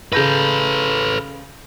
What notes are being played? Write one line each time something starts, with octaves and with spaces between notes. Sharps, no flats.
C#3 A4 B4 G6 A#6